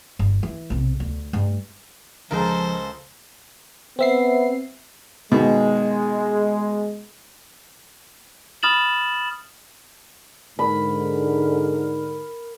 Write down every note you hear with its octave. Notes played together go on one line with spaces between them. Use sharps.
G1
E3
B1 C3
D2
G2 A3
C#2 F3 G#3 F4 A4 A#4 C5
B3 C4 E5 C7
B2 D#3 G#3
B5 D#6 F6 A6 E7 F#7
G#2 D3 A#4 B5